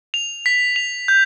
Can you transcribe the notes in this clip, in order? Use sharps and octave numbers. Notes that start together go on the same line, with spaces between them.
F7
B6
F7
G6